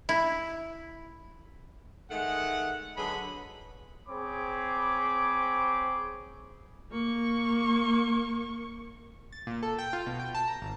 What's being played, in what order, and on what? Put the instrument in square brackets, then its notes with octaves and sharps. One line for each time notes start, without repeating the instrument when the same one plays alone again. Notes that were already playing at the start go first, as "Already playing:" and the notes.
[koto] E4
[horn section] D#3 G#3 A3 F#5
D3 F#3 B3 G#4 B5
[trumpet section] C4 G#4 C#5 B5 D6
[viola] A#3 C#6
[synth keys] A6
A#2
A4
G5
F4
B2
G5
A5
A#5
G#1